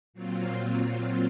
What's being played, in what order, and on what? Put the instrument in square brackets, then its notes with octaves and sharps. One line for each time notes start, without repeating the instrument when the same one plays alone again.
[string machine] A#2 F#3 C4 F4